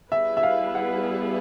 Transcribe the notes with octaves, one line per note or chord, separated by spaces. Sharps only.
G3 B3 E4 G#4 B4 E5
E5
F5
F#5